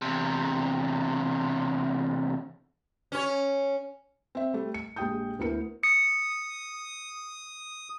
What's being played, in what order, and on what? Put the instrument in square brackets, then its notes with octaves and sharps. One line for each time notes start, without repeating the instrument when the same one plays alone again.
[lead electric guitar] E2 C3
[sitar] C#4 C#5
[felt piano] C4 E5
G3 A3
C#7
A#1 G#3 G4 G5 D#6 G6
D2 B3 E4 A#4 C#7
[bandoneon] D#6 [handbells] C#7